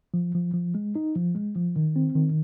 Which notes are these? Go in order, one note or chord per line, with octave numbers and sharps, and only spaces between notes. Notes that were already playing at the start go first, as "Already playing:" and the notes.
F3
F3
F3
G#3
D#4
F3
G#3
F3
D#3
C4
D#3